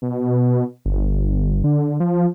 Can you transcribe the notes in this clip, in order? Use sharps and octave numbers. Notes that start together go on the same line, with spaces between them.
B2
G1
D3
F3